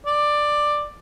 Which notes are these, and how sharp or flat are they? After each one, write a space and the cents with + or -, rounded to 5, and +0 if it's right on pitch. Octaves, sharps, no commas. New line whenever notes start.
D5 +10